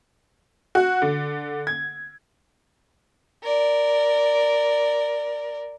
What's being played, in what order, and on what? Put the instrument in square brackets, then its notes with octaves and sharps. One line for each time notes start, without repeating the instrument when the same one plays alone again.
[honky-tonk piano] F#4
D3
G#6
[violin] A#4 D5